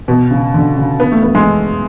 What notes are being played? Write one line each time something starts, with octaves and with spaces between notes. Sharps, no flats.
B2
C#3
D3
C#3
B3
A3
B3
G#3